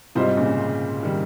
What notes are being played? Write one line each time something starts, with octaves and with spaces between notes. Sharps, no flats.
G#2 C3 G3 C4 F4 C5
A#2 C#3
D#3 G3